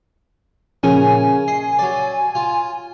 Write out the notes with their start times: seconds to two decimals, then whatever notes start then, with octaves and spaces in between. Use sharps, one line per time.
0.83 A#2 C#3 F3 C#4 A#4 G#5
1.48 D#5 C7
1.79 F#3 D5
2.35 F4